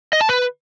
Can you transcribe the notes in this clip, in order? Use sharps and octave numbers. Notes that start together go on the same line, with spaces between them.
D#5
A5
B4